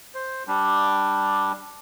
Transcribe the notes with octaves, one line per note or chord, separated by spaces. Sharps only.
C5
G3 D4